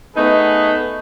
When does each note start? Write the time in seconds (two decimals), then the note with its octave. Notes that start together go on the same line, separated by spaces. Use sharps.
0.16 A3 B3 D#4 G#4 B4